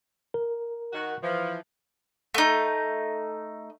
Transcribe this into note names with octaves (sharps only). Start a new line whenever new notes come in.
A#4
D#3 F#4
E3 F3
A3 D#4